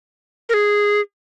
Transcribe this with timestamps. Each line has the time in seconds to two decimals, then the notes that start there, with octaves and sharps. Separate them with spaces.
0.49 A#4
0.54 G#4